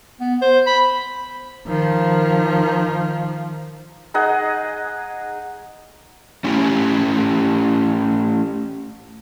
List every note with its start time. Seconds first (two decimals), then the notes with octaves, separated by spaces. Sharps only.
0.21 B3
0.42 C5
0.66 B5
1.67 D#3 F3
4.14 D#4 G#4 D#5 F#5
6.44 A3 C#4 E4 G4